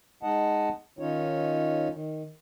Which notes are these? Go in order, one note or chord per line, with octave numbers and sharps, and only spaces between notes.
G#3 D#4 D#5 F#5 A5
D#3 C#4 D#4 F4 C#5
D#3